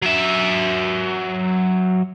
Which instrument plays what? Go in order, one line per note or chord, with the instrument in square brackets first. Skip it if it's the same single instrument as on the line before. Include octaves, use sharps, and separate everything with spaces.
[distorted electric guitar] F#3 E5